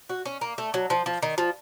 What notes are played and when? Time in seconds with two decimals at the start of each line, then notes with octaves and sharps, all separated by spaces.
0.09 F#4
0.25 C#4
0.41 A#3
0.58 A3
0.74 F#3
0.90 F3
1.06 F3
1.22 D#3
1.38 F3